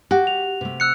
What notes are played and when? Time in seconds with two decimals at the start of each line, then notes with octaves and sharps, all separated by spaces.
0.11 F#4 G4
0.27 F7
0.61 C3 A3
0.80 E6 F#6 C#7